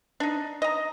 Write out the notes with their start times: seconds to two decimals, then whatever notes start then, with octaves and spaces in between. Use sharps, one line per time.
0.20 D4 D#4
0.62 D#5 A#5